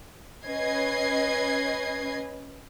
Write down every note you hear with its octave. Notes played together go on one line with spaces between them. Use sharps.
C#4 B4 D#5 G#6 C7